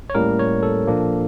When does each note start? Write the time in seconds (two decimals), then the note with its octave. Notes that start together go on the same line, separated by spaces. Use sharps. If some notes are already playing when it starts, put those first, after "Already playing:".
0.10 C#5
0.15 A2 G3 A#3 C#4 A#4
0.39 C#5
0.63 A4
0.87 A#2 F3 A#3 D4